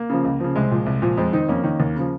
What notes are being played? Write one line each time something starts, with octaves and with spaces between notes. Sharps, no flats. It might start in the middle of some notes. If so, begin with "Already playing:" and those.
Already playing: A#3
C#3 F3
C#2
C#3 F3
C2 G#3 C4
A#2 F3
C2
A#2 F3
F2 G#3 C4
D#3 C4 D#4
F2 A#3 C#4
D#3
D#2
C#3 F3